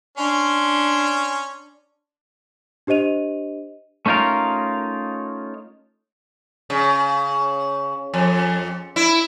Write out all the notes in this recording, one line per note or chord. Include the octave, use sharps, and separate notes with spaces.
C#4 D4 C6
D4 G4 C5 D#5 D#7 F7
A3 C#4 D#4 F4 A#4
C#3
F2
E4